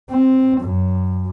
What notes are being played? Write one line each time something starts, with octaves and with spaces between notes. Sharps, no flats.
C4
F#2